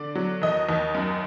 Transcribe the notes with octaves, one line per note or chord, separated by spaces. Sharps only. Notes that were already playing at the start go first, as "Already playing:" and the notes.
Already playing: D3 D5
F#3
D#2 D#5
D#2
F#2